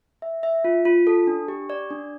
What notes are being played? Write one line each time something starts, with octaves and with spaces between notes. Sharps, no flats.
E5
E5
F4
F4
A4
D4
G4
D5
D4